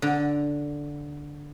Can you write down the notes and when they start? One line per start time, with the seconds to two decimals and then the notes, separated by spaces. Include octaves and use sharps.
0.02 D3